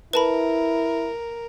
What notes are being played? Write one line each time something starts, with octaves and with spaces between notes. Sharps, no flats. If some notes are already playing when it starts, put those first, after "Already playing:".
E4 A#4 B4 A5 B5